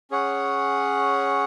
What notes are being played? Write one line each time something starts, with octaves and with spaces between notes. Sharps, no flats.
C#4 G#4 C#5 F#5